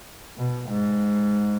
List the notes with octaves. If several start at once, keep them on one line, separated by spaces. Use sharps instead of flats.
B2
G#2